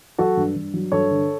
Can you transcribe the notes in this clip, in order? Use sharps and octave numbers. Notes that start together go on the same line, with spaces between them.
F#3 F#4 A4
G2
G2
F#3
G2 A4 C#5
D3